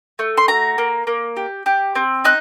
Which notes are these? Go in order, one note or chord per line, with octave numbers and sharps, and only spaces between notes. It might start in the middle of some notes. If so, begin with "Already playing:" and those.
A3
C6
F#4 A#5
A#3
A#3
G4
G4
C4
D#4 F#6